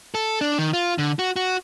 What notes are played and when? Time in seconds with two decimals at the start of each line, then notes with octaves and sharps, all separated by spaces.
0.15 A4
0.41 D4
0.58 D#3
0.73 F4
0.98 D3
1.19 F#4
1.36 F#4